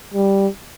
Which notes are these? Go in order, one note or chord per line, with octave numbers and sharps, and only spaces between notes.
G3